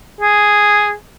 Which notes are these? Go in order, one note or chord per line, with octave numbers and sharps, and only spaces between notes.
G#4